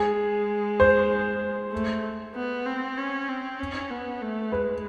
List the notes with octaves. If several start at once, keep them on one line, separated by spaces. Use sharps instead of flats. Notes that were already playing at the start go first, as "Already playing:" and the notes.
Already playing: G#3 G#4
C5
A3
B3
C4
C#4
C4
C#4
B3
A3
G#3 B4